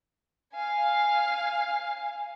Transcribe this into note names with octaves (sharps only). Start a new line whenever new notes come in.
F5 G#5